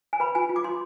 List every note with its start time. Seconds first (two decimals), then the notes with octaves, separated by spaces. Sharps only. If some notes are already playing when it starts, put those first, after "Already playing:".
0.13 G#5
0.20 B4 B5
0.35 F4 G#5
0.49 F4
0.56 D6
0.64 F4 C6